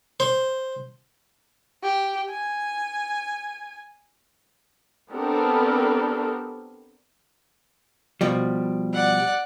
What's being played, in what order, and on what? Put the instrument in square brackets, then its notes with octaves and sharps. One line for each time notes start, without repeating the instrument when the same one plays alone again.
[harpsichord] C5
[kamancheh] G4
G#5
[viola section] B3 C4 D4 G4 A4 A#4
[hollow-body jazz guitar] B2 F3 G3
[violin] D5 F#5